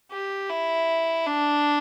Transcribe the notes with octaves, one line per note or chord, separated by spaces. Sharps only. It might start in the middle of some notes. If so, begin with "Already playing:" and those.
G4
E4
D4